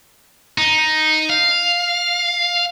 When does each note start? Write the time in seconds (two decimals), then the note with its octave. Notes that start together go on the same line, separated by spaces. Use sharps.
0.58 D#4
1.30 F5